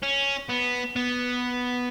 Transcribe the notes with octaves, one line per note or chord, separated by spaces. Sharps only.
C#4
B3
B3